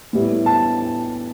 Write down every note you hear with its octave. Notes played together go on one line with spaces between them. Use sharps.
A2 G3 B3 E4
A5